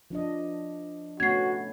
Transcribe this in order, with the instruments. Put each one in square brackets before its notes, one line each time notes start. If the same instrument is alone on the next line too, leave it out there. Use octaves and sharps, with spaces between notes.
[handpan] F3 D4 D#5
[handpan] A3 B3 C#4 [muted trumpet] F#4 [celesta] G#6 C7